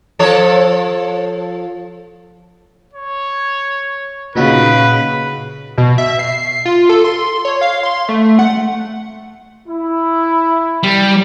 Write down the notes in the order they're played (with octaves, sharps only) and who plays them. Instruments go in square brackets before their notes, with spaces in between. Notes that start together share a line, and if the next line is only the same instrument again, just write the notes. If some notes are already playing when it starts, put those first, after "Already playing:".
[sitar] F3 A4 C#5
[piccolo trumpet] C#5
[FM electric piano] A#2 D#4 F#4 [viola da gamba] C#3 [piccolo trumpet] B4
[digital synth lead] B2
E5
C7
F4
A4
C6
C#5
F5
C6
A3
F#5
[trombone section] E4
[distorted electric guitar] G3